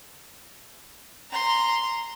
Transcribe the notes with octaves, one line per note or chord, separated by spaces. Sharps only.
A#5 C6